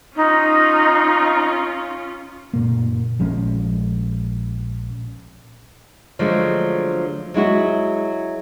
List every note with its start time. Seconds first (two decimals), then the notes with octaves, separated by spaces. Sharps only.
0.16 C#4 D#4 F4
2.53 F#1 A#2 A#3
3.19 A#1 F3 G#3 C#4
6.19 D3 F3 F#3 G#3 A3
7.34 F#3 G#3 E4 F#4